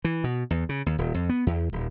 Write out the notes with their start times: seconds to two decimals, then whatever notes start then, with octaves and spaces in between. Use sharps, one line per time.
0.04 E3
0.24 B2
0.50 E2
0.69 C#3
0.86 D#2
0.98 D#1
1.14 F2
1.29 B3
1.47 E2
1.73 D#1